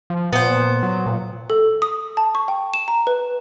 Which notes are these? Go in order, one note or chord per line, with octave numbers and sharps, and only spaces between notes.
F3
A#2 B3 C5
F#3
A#2
A4
D#6
A5
C#6
G5
E7
A#5
B4